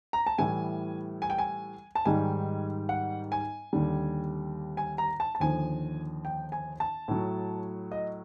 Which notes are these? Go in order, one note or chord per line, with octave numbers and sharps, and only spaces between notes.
A#5
A5
A2 E3 G3 G#5
G#5
G5
G#5
A5
G#2 D#3 G3 G#5
F#5
G#5
D#2 D3 G3
G#5
A#5
A5
A5
D#2 D3 F3 G#5
G5
G#5
A5
A2 F#3
D#5